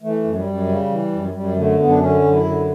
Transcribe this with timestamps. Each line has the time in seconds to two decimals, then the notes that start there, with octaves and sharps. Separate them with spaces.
0.02 E3 A3
0.24 F#2
0.36 G3
0.46 F#2
0.68 C#3
0.90 E3
1.12 F#2
1.34 F#2 G3
1.56 D3 A3
1.78 F#2 B3
1.89 D4
1.99 D3 C#4
2.22 F#2
2.33 E4
2.44 D3